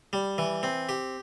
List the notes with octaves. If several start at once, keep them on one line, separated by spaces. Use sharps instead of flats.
G3
E3
C4
G4